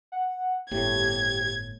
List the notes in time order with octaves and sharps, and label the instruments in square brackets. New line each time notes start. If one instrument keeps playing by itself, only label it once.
[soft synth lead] F#5
[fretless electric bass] G1 A2 [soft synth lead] G4 [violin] G#6